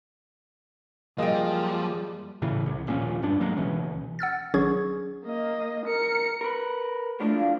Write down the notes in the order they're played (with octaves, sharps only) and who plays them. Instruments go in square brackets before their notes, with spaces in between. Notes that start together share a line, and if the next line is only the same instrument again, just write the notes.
[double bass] F#2 G3 [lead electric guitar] F3 [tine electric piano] A#3 G#4 [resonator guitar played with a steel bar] D#5 G5
[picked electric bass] A2 C#3 E3
C2
D#1 A#1 A#2 C#4
D1 G2 D4
A1 F#3 G#3 A#3
C#2 B2 E3 C#4
[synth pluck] F#5 E6 F6 A6
G#1 F#3 C#4 G#4 C#6 G#6
[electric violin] A#3 D#5
A#4 C#7
[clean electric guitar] A#4 B4
[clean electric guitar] A2 F3 D4 [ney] A3
[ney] F5